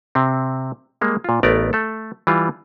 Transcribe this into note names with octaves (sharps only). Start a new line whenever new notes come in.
C3 C4
G3 G#3 A#3
A#2 F4
A1 A3 B3 A#4 D5
A3 A4
E3 G3 F4